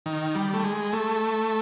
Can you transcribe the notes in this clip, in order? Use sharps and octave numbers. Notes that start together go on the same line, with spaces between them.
D#3
G3
A3
G#3
A3